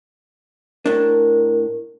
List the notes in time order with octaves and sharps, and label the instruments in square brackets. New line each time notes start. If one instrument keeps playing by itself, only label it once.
[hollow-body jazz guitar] A2 D4 [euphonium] A#4